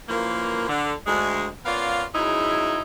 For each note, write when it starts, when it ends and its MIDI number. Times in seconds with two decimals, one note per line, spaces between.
0.08 0.67 42
0.08 0.67 52
0.08 0.67 53
0.08 0.67 58
0.69 0.92 50
1.07 1.46 38
1.07 1.46 56
1.65 2.04 59
1.65 2.04 61
1.65 2.04 65
1.65 2.04 70
1.65 2.04 74
1.65 2.04 77
2.14 2.82 44
2.14 2.82 49
2.14 2.82 54
2.14 2.82 63
2.14 2.82 64